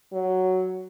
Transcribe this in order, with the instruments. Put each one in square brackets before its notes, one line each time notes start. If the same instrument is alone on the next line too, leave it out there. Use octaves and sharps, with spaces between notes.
[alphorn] F#3